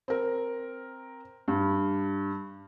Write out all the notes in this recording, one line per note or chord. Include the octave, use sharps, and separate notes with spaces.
C4 A#4
G2